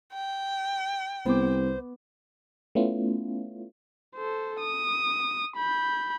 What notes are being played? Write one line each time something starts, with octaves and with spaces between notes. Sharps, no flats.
G5
C2 B3 C5 D6
A3 B3 C#4 E4 F4
A4 C5
D#6
B5 G6